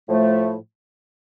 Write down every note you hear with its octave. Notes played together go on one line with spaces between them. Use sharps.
A2 F3 A3